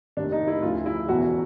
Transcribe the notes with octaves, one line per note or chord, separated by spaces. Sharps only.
F1 D#2 D#3 D4
D#4
E4
D2 C#3 F3 F4
E4
E1 E2 B2 F#3 F#4